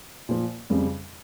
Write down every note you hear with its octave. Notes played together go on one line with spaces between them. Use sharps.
A#2 F3
F2 C#3 G3